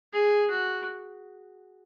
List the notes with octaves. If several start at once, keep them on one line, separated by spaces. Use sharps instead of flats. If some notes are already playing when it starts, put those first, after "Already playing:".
G#4
F#4